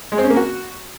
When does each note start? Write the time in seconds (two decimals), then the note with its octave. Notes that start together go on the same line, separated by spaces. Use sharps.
0.12 G#3
0.18 C4
0.24 C#4
0.30 A#3
0.37 F#4